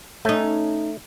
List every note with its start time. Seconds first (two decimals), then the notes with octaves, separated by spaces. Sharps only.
0.25 A3 C#4 D#4